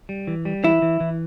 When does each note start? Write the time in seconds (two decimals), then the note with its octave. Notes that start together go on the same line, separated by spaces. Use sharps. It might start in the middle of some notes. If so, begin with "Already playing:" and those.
0.09 G3
0.27 E3
0.45 G3
0.64 E3 E4
0.82 E3
1.00 E3